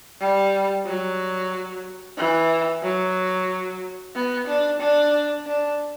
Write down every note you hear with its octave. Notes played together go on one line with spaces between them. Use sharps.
G3
F#3
E3
F#3
B3
D4
D4
D4